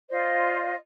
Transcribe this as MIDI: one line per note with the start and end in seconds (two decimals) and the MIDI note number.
0.10 0.75 65
0.10 0.75 72
0.10 0.75 74
0.10 0.75 75